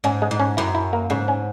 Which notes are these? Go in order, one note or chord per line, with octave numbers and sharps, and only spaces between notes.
G#2 C#4
G#3
G#2
C#4
F#2 E4
E4
A#3
G#2 C#3
C#4